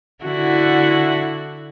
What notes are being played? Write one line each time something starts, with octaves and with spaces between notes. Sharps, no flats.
D3 E4 F#4